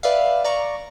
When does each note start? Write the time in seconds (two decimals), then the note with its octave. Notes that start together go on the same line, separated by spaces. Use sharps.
0.03 B4 D5 E5 F5
0.44 D5 A#5 C#6